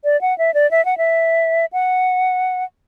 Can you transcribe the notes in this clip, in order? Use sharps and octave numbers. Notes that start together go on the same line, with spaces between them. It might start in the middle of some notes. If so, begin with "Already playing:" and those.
D5
F#5
E5
D5
E5
F#5
E5
F#5